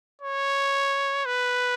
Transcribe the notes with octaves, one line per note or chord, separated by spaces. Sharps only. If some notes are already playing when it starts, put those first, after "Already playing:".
C#5
B4